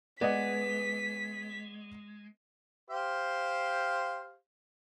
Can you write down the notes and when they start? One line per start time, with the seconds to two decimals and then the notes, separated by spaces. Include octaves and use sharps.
0.21 G#3 B3 D5 D#5 F#5 B6
2.90 G4 C5 F5